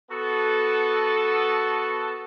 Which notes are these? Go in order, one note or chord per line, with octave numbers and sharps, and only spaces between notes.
B3 F#4 A4